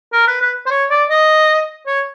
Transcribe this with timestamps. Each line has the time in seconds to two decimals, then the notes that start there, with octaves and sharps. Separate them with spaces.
0.12 A#4
0.27 B4
0.41 B4
0.66 C5
0.71 C#5
0.90 D5
1.10 D#5
1.87 C#5